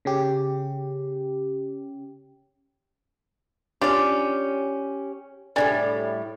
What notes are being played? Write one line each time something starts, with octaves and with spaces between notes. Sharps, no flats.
C#3 C#4 G4
C#4 D4 F4 G4
A2 D3 G3 D4 G#5